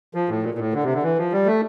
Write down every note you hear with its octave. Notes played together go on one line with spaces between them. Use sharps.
F3
A2
A#2
A#2
A2
D3
C3
D3
E3
F3
G3
A3